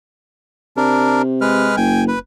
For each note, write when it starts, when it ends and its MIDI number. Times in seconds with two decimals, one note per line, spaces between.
0.77 1.71 48
0.77 1.22 62
0.77 1.22 70
1.41 1.76 56
1.41 1.76 71
1.41 1.76 89
1.77 2.13 30
1.77 2.04 79
1.77 2.04 80
2.08 2.19 71